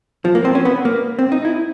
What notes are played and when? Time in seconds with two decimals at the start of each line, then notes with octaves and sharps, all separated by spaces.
0.25 F3
0.35 A#3
0.45 C4
0.55 C#4
0.65 B3
0.85 A#3
1.19 C4
1.32 D#4
1.45 E4